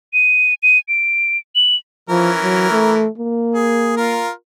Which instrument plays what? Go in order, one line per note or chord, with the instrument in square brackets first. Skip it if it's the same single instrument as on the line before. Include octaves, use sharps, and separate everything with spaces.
[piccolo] D#7
D#7
D7
F#7
[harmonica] E3 C#4 A#4 [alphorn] F3
[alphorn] F#3
A3
A#3
[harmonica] G#4
F4 A#4